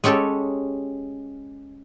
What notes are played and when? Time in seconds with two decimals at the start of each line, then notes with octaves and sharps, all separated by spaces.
0.04 G#3 C#4 G4 A4 C#5